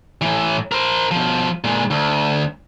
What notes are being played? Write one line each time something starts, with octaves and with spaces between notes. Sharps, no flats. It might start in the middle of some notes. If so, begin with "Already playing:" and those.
A2 E3
A#4 C5
B2 F3
A#2 G#3
D2